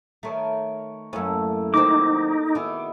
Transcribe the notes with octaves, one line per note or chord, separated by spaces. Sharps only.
D#3 A3 B4 C#5 A#5
F#2 A2 A#3 C#4 A4
D#3 F#3 C4 D#4 D6
B2 D#3 E4 G#4